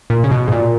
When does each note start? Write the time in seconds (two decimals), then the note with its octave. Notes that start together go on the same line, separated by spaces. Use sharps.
0.10 A#2
0.24 C#3
0.31 B2
0.48 G#2
0.52 A#2